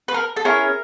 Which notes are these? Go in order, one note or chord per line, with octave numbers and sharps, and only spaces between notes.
B4
A#4
A4
C#4 E4 G#4 A#4